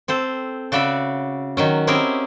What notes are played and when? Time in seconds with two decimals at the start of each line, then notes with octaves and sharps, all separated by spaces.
0.08 C4 A4 C5
0.72 C#3 F#4 D5 E5 B5
1.57 D#3 F#3 C#4
1.87 C4 C#4 E4 G4 G#4 A#4